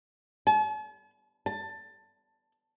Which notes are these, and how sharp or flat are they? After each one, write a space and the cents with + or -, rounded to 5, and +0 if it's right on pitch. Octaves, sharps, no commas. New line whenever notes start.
A5 -45
A5 +15